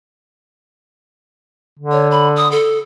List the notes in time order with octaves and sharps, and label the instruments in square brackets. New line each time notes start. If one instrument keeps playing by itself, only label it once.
[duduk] D3
[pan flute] C#5
B5
D#6
A4